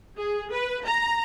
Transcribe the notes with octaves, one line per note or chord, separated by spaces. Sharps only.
G#4
B4
A#5